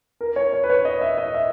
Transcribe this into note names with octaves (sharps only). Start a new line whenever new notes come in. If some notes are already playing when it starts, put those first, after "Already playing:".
A#4
C#5
C#5
B4
C#5
D#5
E5
D#5
E5